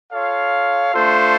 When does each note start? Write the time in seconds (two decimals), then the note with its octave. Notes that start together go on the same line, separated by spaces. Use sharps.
0.12 F4 A4 C#5 F5
0.94 A3 D4 F4 A4 C5